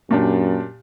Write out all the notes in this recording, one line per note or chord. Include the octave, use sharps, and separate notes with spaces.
F#2 A#2 D4 G4